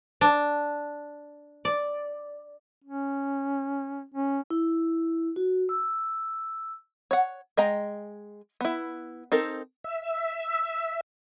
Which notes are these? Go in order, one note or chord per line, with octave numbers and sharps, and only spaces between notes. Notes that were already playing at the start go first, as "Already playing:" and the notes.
D4
D5
C#4
C#4
E4
F#4
E6
C#5 F#5
G#3 D#5 G5 A#5
B3 E4
C4 D#4 A4 A#4
E5